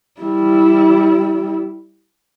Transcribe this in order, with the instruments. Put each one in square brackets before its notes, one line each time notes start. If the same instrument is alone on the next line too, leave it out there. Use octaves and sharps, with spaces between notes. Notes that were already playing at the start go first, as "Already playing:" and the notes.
[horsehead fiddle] G3 E4